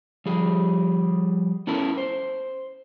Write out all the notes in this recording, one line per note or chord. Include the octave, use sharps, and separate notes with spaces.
F3 G3 G#4
B3 C#4 E4 A4 A#4
C5